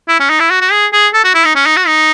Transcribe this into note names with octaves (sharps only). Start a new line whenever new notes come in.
E4
C#4
D#4
E4
F#4
F#4
G#4
G#4
A4
F#4
E4
D#4
C#4
D#4
F#4
D#4